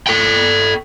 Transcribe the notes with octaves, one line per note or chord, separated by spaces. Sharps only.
A4 G5